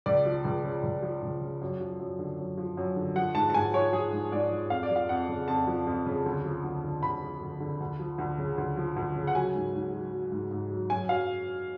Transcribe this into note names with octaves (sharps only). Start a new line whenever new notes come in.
C#2 D5
F3
C#2
C#3
C#2
F3
C#2
C#3
F#2
F3
F#2
D3
F#2
F3
F#2
D3
F3 F#5
G#2 A5
A5
G#2 G#5
F3 C#5
F3 G#4
G#2
G#2 D5
F3
F2 F5
D5
F3
F5
F2 F#5
C#3
F2 A5
F3
F2
C#3
D2
F3
D2
D3
D2 B5
F3
D2
D3
D2
F3
D2
C#3
D2
F3
D2
C#3
F#5
F#3 G#5
G#2
G#2
F#3
F#3
G#2
G#2
F#3
F#2 G#5
F#3 F5